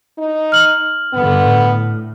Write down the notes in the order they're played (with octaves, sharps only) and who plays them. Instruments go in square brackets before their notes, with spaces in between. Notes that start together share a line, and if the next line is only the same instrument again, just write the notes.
[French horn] D#4
[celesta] F6 F#7
[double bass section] G2 D3 [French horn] B3
[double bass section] A2